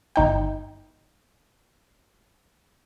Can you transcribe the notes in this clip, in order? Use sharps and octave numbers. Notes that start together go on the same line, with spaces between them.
G1 D#4 G5